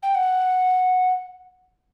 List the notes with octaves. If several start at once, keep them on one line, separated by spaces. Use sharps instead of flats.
G5
F#5